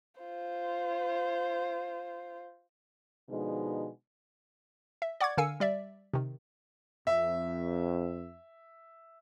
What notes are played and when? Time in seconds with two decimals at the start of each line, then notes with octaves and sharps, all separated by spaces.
0.21 F4 C5
3.30 B2 D3 F3 G#3 D#4
5.02 E5
5.20 D5 F#5 C#6 D6 G#6
5.37 D3 A#4 F5 G#5 E6 C#7
5.60 G3 D5 E5
6.14 C3 D#3
7.07 F2 E5